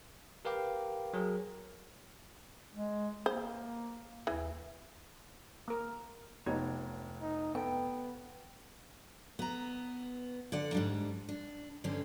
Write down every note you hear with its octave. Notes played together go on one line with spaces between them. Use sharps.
G4 A#4 B4 F5 G5 D6
F#3 G#4 A#4
G#3
A#3 C5
D#2 E3
A#3 A#4
F1 B3 D#4 C#5
D#4
B3 A4 G5
B3 A#5
D3 D5 F#5
G#2 G3 D4
D4
G2 D3 C4 C#4